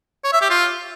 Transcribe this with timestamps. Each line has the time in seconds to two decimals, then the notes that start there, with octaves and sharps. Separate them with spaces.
0.24 C#5
0.33 E5
0.41 G4
0.50 F4